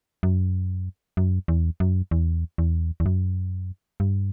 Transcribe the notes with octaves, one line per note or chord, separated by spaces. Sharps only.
F#2
F#2
E2
F#2
E2
E2
E2
F#2
G2